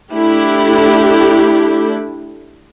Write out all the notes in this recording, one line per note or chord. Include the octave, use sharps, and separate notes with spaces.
A3 D4 E4 G4 A4